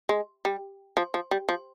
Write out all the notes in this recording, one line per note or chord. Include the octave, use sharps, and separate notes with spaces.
G#3
G3
F3
F3
G3
F3